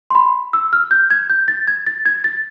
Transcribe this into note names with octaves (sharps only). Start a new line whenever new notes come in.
C6
B5
E6
F6
G6
G#6
G6
A6
G#6
A6
G#6
A6